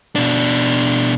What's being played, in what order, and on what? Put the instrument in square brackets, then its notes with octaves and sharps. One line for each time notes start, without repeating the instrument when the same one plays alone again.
[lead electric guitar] B2 D4